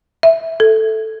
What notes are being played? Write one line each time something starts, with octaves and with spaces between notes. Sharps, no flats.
E5
A4